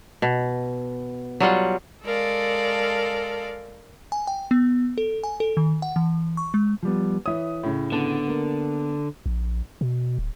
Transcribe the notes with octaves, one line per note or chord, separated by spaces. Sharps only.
B2
F#3 G3 F4 F#5
G#3 A4 A#4 D5 F5
G#5
G5
B3
A4
G#5
A4
D#3
F#5
E3
C#6
G#3
F3 G3 B3
E3 C#5 E5 D#6
A2 C#3
D3 B3 A5
A#3
A#1
B2
D1